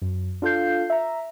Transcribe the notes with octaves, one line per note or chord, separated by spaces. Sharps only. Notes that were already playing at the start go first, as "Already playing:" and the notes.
F#2
D4 F4 A4 F5 G6 C7
E5 A#5